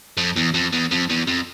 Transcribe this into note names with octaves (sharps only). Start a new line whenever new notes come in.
F2
E2
F2
E2
F2
E2
F2